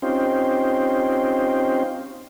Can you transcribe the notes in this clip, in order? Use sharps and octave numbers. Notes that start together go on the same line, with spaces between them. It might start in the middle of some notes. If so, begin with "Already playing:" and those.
C4 C#4 D#4 F4 G4 C5